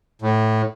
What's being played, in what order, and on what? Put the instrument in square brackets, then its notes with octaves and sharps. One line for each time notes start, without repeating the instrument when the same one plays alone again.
[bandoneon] A2